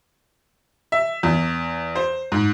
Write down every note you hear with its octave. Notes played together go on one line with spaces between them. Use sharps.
E5
E2
C5
G#2